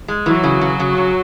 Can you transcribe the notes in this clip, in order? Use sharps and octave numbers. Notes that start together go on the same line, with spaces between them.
G#3
E3 F#3 F#4
C#3
C#3
C#3
C#3